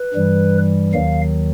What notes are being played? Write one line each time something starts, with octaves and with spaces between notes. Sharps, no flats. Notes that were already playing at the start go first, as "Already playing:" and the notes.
Already playing: B4
G2 E3 G3
D#2 D#3 F#3 F5